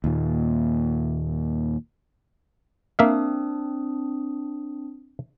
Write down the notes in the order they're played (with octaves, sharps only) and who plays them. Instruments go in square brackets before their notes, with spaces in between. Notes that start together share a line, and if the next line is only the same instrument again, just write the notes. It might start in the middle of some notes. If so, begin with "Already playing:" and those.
[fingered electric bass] D#2 A#2
[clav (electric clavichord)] A#3 E5 F5 [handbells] C4 D4 D#6